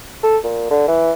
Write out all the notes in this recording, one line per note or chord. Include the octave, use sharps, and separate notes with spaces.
A4
A#2
D3
E3